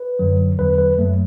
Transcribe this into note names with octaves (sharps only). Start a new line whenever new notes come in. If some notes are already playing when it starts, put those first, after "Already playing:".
Already playing: B4
F#2 D3 F#3
E2 D3 F#3 B4
B4
F#2 F#3 A3